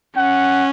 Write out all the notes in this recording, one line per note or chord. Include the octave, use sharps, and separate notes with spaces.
C#4 F#5